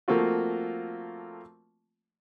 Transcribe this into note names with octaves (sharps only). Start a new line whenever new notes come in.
F3 A3 A#3 C4 F4 F#4